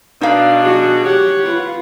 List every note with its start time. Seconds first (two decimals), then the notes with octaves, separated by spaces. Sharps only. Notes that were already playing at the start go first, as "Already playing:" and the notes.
0.21 B2 D4 D#4 F5
0.62 F#4 G#4
1.04 G4 C#5 F#5
1.44 F4 B4